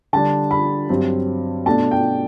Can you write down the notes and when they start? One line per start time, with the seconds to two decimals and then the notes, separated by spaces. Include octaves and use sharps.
0.13 D3 G3 D4 A5
0.51 B5
0.89 G2 F#3 C4
1.66 B2 A3 D4 A5
1.91 G5